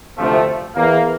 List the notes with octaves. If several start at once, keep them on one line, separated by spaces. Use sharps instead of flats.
D2 C3 F3 A3
E2 E3 A#3